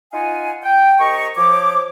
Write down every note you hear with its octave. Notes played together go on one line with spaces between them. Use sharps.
D#4 F4 F5 F#5 G#5
G5
C2 D#5 A#5 C#6
F3 C#5 D6